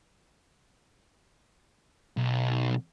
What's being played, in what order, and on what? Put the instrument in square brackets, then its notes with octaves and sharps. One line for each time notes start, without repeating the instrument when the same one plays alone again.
[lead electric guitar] B1